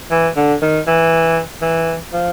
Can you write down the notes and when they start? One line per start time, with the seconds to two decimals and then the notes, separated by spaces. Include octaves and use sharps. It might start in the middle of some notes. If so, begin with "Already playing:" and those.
0.11 E3
0.36 D3
0.62 D#3
0.87 E3
1.62 E3
2.13 F3